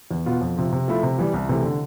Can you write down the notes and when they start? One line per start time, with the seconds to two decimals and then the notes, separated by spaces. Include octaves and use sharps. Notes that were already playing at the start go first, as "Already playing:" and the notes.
0.11 E2
0.26 B2 B3 F4
0.41 F2
0.57 C3 F3
0.73 C3
0.88 F3 A3 E4
1.03 C3
1.19 E3 G3
1.34 C2
1.49 C3 E3 A3
1.64 D3